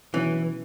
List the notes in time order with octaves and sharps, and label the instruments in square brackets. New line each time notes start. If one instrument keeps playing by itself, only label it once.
[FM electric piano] B2 F#3 C#4 E4 [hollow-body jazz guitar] E3